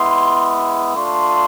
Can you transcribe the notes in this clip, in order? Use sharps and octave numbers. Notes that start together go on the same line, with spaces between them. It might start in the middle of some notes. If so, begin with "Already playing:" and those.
Already playing: G#3 B3 E4 C6
A3 D4 F4 C6